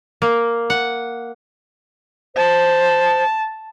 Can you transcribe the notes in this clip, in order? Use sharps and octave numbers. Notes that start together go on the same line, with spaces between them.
A#3
F#5
C5 A5